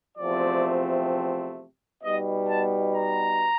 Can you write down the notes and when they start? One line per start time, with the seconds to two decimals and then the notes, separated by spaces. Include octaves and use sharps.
0.18 E2 C3 F3 A3 C4 D5
2.02 B2 G3 B3 D#4 D#5
2.48 A5
2.94 A#5